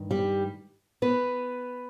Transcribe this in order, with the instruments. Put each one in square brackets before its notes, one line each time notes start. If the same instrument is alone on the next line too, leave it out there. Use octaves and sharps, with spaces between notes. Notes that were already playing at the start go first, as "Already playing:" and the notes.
Already playing: [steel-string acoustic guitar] G2 D#3
G3 G4
B3 B4